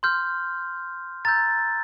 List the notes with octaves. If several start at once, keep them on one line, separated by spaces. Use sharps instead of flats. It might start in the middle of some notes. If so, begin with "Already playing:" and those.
C6 F6 G6
A#5 E6 G6 A6